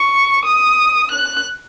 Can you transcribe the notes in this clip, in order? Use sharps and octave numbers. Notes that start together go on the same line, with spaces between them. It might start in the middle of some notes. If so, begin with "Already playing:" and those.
Already playing: C#6
D#6
F#6